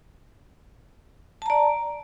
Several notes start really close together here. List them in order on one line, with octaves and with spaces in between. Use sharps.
A5 A#5 D5